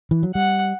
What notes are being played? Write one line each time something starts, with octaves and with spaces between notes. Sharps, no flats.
E3
F#3
G3 F#5